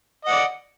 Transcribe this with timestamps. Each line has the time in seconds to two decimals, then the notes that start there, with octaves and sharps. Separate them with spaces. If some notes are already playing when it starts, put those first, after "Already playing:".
0.25 D#5
0.28 F#5
0.31 D5